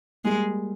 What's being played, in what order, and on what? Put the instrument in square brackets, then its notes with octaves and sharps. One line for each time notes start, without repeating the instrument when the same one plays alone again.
[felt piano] G3 A#3 [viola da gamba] G#3